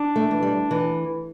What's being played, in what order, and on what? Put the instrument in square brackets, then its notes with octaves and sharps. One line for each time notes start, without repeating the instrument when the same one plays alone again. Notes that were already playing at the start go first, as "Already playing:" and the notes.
Already playing: [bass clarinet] D4
[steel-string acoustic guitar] A3
E3
G3
E3